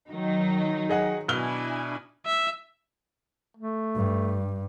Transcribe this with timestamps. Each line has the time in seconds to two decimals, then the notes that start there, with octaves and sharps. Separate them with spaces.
0.10 D#3 F#3 D#4
0.89 G#4 D#5 F#5
1.28 B2 D4 E4 G#5 F6 G7
2.26 E5
3.57 A3
3.96 G2